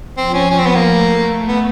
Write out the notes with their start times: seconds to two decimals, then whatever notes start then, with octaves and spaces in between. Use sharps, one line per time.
0.18 F3 C4
0.34 C#4
0.50 F3 C#4
0.59 C4
0.66 B3
0.75 A#3
0.83 A3
1.48 B3